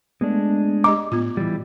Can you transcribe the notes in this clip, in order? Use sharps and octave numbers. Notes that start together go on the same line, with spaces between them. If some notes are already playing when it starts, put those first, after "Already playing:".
G#3 A3 B3 D4
G4 D#5 A#5 D6
A2 B3 F4
E3 G3